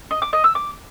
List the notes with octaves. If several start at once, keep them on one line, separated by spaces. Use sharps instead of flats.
D#5
D6
D#5
E6
D6